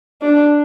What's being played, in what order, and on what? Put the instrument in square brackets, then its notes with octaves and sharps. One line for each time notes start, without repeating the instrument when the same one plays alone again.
[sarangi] D4